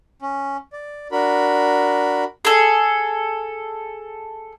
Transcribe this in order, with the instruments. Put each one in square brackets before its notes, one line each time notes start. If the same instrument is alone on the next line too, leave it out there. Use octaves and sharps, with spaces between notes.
[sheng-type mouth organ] C#4
D5
D4 F#4 A#4 B5
[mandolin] G#4 A4